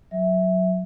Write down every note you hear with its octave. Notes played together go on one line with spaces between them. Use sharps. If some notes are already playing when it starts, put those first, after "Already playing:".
F#3 E5
F#3